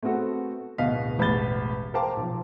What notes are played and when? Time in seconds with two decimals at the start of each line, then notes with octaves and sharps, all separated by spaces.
0.03 A3 B3 C4 F#4 A4
0.78 D1 B2 D#5 F5 B6
1.18 E1 A1 E2 B5 A6 G7
1.94 A#4 C5 F5 G5 A5 D6
2.17 B1 F3